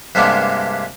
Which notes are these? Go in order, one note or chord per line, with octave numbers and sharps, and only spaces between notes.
G2 C3 G#3 A#3 B3 D4